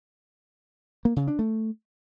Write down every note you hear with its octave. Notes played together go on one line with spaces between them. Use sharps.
A#3
C#3
D4
A3